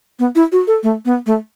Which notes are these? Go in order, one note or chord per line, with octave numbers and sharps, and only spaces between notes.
B3
E4
F#4
A4
A3
B3
A3